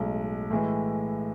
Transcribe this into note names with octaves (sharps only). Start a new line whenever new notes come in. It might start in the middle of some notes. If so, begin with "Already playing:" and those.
Already playing: B1 A2 G#3
A2 E3 G#3